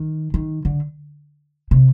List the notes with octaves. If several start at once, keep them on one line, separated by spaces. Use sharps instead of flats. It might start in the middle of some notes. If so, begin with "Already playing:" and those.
Already playing: D#3
D#3
D3
C3